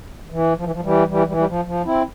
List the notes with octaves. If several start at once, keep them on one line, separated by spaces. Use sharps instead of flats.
E3
F3
E3
F3
E3 G3
E3 G3
E3 G3
G3
F3
F3
C4 E4